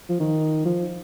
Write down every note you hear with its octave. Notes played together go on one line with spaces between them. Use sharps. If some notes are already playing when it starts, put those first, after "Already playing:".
F3
D#3
F3